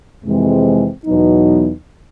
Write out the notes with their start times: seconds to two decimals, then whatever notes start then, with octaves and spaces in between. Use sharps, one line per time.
0.24 F2 C3 E3 G#3 C4
1.06 E2 B2 F#3 B3 D#4